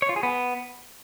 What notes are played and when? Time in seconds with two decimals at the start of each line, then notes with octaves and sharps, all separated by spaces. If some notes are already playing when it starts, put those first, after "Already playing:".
0.02 C#5
0.09 F4
0.16 G#4
0.23 B3